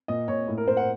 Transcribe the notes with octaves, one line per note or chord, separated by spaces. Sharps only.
A#2 D#5
A#2 C#5
A2
A#4
A2 C5
F#5